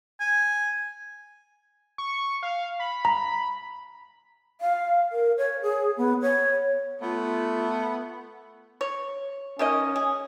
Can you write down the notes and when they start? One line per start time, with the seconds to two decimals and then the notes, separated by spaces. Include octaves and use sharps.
0.20 G#5
1.98 C#6
2.43 F5
2.80 B5
3.05 A#5
4.61 F5
5.12 A#4
5.38 C#5
5.62 G#4
5.97 B3
6.22 C#5
7.02 A3 B3 F4
8.81 C#5
9.59 D#3 A#3 C#4 D#5
9.96 G#4